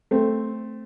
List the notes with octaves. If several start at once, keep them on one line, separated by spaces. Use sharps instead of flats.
A3 C4